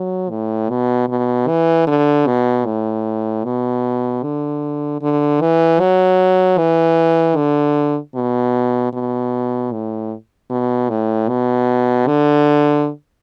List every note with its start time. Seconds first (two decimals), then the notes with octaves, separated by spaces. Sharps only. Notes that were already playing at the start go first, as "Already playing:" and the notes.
Already playing: F#3
0.30 A2
0.70 B2
1.09 B2
1.48 E3
1.87 D3
2.27 B2
2.66 A2
3.45 B2
4.23 D3
5.02 D3
5.41 E3
5.80 F#3
6.58 E3
7.37 D3
8.15 B2
8.93 B2
9.72 A2
10.50 B2
10.90 A2
11.29 B2
12.07 D3